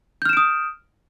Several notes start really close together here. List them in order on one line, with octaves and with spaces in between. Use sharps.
G6 F6 E7 D7 D#6